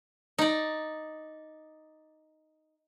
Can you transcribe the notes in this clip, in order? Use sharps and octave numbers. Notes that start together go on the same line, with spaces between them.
D#4 D5